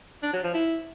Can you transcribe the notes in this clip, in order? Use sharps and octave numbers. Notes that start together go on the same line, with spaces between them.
D4
F#3
F3
E4